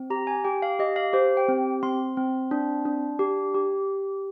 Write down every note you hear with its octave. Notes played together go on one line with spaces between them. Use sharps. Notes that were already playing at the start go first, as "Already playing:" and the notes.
Already playing: C4
G4 A#5
G#5
G4 G5
F5
G4 D#5
F5
G4 C5
G5
C4
C4 C6
C4
D4
D4
G4
G4